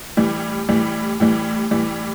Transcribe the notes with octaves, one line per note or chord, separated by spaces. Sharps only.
A2 E3 G3
A2 E3 G3
A2 E3 G3
A2 E3 G3